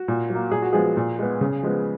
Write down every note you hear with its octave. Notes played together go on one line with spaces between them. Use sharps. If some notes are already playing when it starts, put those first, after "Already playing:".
Already playing: F#4
A#2
F#3
A#3
A#2 G#4
F#4
F3 G#3 B3 G#4
A#2
G#3 B3
C#3
F3 G#3 B3